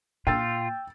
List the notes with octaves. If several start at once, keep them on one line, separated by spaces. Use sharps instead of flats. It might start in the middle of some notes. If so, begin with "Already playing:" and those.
A#2 F4 G5 E6 A6